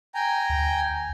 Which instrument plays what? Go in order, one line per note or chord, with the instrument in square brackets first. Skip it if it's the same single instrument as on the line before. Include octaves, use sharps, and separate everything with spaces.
[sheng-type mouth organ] G5 G#5 A#5
[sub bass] D2